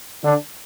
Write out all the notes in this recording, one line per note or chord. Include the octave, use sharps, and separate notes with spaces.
D3 D4